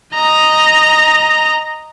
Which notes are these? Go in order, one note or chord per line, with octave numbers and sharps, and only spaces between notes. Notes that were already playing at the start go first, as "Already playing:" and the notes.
D#5 A#5